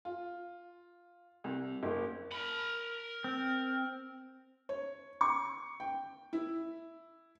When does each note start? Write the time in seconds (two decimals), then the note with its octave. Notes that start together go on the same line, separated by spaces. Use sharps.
0.05 F4
1.44 C2
1.83 F#1
2.32 A#4 B5
3.24 C4
4.69 C#5
5.21 C#6
5.80 G5
6.33 E4